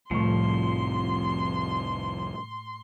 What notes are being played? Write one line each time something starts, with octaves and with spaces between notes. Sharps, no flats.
C2 F2 A2 F3 A3 C6